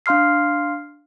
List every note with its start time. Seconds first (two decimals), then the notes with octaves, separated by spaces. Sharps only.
0.06 D4 F5 C6 F6 C7